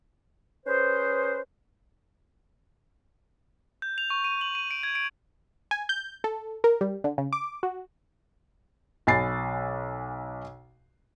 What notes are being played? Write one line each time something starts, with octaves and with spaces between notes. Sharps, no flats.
C#4 G#4 B4 C5
G6
F7
C#6
D#7
F#7
D#7
D7
G#6
D7
G#5
G6
A4
A#4
G3
D3
C#3
D6
F#4
B1 G#5 B5 A6 C7